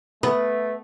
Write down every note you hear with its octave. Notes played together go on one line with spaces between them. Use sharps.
A3 B3 B4